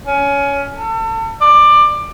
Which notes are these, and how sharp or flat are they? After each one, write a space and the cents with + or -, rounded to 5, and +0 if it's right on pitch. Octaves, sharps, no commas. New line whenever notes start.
C#4 +20
A4 +35
D5 +20